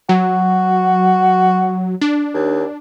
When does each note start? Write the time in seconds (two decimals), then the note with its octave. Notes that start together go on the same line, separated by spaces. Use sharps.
0.09 F#3 F#4
2.02 D4
2.34 D#2